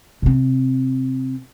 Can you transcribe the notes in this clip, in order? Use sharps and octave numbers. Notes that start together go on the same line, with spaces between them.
C3 C4